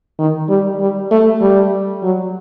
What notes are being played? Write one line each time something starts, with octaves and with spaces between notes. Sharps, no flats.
D#3
G3
G3
A3
G3
F#3